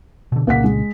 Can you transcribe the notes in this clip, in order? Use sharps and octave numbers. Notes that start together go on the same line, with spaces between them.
B2 D3
C2 A#2 C#3 A#3 F#5 B6
G#3